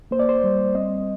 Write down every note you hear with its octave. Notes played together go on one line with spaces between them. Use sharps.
A#3 C5
D5
C5
G3
C4 D#5